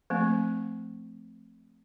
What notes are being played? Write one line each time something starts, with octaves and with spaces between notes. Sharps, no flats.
F3 A3 A#3 C4